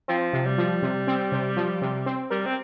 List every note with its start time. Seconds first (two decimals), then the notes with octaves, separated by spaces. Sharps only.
0.08 F3 C4
0.33 C3
0.46 G3
0.58 F3
0.82 C3
1.07 C4
1.32 C3
1.57 F3
1.82 C3
2.06 C4
2.30 G3 A#4
2.46 C4